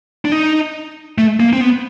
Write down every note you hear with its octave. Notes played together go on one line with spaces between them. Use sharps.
D4
D#4
A3
A#3
C4
B3